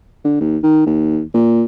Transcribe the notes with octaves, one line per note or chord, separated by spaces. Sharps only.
D3
D#2
D#3
D#2
A#2